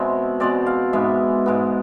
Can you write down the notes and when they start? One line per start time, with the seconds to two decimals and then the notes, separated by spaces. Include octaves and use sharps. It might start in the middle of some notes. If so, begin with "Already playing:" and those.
Already playing: B2 G#3 C4 E5
0.40 B2 G#3 C4 D5
0.66 F5
0.93 G#2 G#3 B3 E5
1.46 G#2 G#3 B3